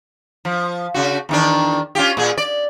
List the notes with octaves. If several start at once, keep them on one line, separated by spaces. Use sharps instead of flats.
F3
C#3 F#4
E2 D#3 D4
C#4 F4 G4
A#2 G#4
D5